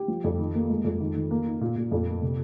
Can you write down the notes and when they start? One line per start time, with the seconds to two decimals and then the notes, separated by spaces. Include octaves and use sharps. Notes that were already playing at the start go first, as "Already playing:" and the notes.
Already playing: G4
0.08 F3
0.24 F2
0.38 D#3
0.55 A#3
0.69 G#3
0.84 F2
1.00 D#3
1.15 D#3
1.31 A#3
1.46 D#4
1.61 A#2
1.76 A#2
1.92 F2
2.07 A#3
2.22 C3